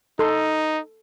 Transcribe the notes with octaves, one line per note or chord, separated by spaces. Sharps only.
D#4 A4 C6